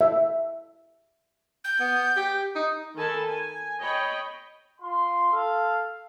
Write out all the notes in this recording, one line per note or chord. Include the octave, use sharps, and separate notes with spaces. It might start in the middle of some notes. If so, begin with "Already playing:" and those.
E5
G6
B3
G4
D#4
D#3 A4 G#5 A5 B5
G#5
C#5 D#5 G5 B5
F4 C6
A4 F5